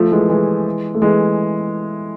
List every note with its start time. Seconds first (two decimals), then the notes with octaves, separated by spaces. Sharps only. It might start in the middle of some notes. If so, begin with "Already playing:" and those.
Already playing: F3 A3
0.12 E3 G#3
0.30 E3 G#3
0.94 A3
1.02 E3 G#3